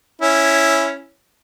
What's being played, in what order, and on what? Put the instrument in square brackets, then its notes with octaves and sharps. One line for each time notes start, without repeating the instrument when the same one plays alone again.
[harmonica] C#4 E4